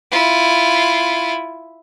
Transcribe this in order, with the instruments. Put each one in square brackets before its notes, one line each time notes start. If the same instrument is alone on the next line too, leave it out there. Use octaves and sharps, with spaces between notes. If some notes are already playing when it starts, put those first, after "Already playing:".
[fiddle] E4 F4